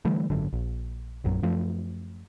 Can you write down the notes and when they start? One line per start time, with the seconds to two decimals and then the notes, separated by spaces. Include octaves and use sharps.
0.05 D3 E3 G3 A3
0.30 G#1 F#2 D3
0.53 A#1
1.24 A#1 F#2 F#3
1.42 F#2 F3 A3